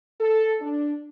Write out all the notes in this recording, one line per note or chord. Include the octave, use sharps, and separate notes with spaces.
A4
D4